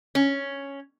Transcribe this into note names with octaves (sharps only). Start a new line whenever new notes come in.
C#4